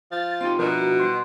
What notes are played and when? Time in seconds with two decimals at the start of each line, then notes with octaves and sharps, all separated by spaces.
0.11 F3 A6
0.41 C4 D#4 F4 G4 C6
0.59 B2 F3 D4 E4 A#4
0.78 F#4
0.99 G3 C5 C6